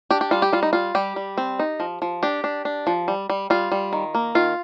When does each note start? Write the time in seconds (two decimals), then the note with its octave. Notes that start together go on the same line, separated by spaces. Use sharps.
0.10 D4 G4
0.21 G4
0.31 G3 F4
0.42 G4
0.53 G3 F4
0.63 D#4
0.73 G3 F4
0.95 G3 G4
1.16 G3
1.37 C4
1.59 D#4
1.80 F3
2.02 F3
2.23 D4 G4
2.44 D4
2.65 D4
2.87 F3
3.08 G3
3.29 G3
3.50 G3 F4
3.72 G3
3.93 D#3
4.15 A#3
4.35 D#3 F4